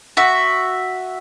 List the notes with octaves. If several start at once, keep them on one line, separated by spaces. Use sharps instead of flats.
F#4 E5